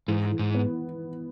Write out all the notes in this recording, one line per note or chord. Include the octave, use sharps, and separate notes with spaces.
G#2 E3
E3
G#2
B3